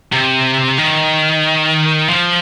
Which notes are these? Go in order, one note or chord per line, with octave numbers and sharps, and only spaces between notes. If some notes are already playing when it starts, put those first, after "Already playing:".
C3
D#3
F3